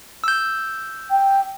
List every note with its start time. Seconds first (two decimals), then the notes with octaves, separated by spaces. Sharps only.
0.24 E6 G6
1.11 G5